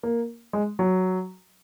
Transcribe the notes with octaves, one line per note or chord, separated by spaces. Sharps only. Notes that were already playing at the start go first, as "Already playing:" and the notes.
A#3
G#3
F#3